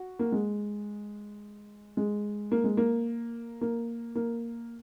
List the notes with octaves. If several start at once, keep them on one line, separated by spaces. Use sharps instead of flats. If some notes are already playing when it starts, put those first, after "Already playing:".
Already playing: F#4
A#3
G#3
G#3
A#3
G#3
A#3
A#3
A#3